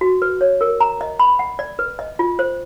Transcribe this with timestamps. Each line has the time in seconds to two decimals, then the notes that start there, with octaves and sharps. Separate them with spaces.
0.01 F#4
0.22 B4
0.41 C#5
0.61 A#4
0.80 A#5
1.01 D#5
1.19 B5
1.39 F#5
1.59 D5
1.79 B4
1.99 D#5
2.19 F4
2.39 C5